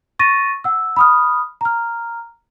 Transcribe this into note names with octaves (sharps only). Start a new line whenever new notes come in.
C#6 A6 A#6 D#7
F#5 E6
B5 D#6 F6
A#5 F6